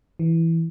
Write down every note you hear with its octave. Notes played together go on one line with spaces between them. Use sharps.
E3